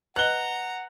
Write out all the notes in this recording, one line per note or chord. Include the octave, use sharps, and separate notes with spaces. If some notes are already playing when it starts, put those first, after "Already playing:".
B4 D#5 F#5 A#5 F#6 G7